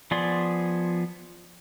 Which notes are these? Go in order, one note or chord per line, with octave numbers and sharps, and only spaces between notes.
F3 B3 G#4 D5 C6